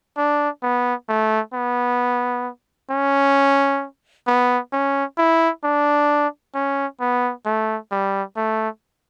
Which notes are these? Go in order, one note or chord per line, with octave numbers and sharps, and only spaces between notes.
D4
B3
A3
B3
C#4
B3
C#4
E4
D4
C#4
B3
A3
G3
A3